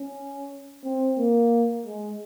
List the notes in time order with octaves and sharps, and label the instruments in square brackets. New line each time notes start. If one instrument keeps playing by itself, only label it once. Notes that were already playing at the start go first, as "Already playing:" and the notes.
Already playing: [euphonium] C#4
C4
A#3
G#3